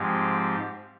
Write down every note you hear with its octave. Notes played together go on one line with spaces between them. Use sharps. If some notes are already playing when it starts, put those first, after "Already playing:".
Already playing: G#2 F3 G#3 C4 G4